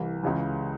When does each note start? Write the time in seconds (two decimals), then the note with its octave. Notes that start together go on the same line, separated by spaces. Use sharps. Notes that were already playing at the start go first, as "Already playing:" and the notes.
Already playing: C2 E3
0.23 C#2 C#3 E3